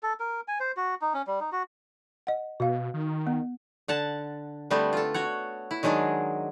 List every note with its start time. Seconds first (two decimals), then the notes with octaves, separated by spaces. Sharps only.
0.03 A4
0.20 A#4
0.48 G#5
0.60 C5
0.77 F#4
1.02 D#4
1.14 C#4
1.27 G3
1.41 D#4
1.52 F#4
2.27 D#5 F#5
2.60 B2 F#4 F5
2.94 D#3
3.27 B3
3.88 D3 F#5 A5
4.70 D3 G3 A3 B3 C4
4.93 F4 A4
5.14 F#4 C#5 F#5
5.71 E4
5.83 D#3 F#3 G#3 D4 G#4